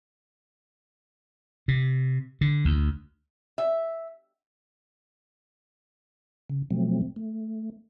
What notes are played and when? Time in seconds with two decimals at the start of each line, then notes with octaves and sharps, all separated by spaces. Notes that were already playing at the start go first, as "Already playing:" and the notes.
1.68 C3
2.41 D3
2.65 D2
3.58 E5
6.50 C#3
6.71 B2 F3 F#3 A3 C4
7.16 A3